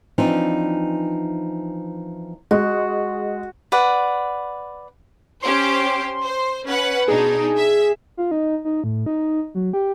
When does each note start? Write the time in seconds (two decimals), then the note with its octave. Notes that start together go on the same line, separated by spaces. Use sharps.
0.18 E3 F3 C4 D4 D#4 F4
2.51 G#3 F#4
3.72 B4 D5 F#5
5.42 C#4 G4 C5 C6
6.25 C5
6.66 C#4 B4 F#5
7.08 B2 D4 D#4 G#4
7.56 E5
8.17 F4
8.31 D#4
8.65 D#4
8.84 A2
9.06 D#4
9.55 F#3
9.73 G4